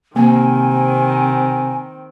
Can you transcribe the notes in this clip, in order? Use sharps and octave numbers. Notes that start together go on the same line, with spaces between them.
C3 D#3 A#3 C4 G#5